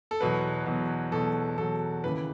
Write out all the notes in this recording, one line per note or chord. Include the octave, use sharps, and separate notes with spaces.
A4
E2 B2 F#3 B4
E2 B2 F#3
E2 B2 F#3 A4
E2 B2 F#3 A4
D#2 C#3 E3 B4